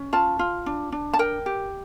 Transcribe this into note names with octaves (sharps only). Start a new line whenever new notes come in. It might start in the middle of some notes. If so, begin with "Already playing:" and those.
Already playing: C#4
F4 A5
F4
D4
D4
A5
A#4 G5
G4